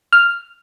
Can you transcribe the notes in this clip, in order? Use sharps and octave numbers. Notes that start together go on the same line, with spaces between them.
F6